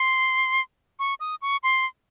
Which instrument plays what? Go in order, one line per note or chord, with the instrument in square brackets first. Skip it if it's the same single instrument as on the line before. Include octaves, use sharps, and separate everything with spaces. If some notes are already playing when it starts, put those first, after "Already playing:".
Already playing: [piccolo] C6
C#6
D#6
C#6
C6